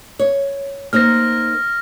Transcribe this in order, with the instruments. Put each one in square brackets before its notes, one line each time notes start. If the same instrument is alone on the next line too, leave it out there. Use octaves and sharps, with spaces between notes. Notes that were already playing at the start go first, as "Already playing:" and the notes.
[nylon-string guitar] C#5
[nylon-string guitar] A#3 D#4 C5 [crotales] F6 A#6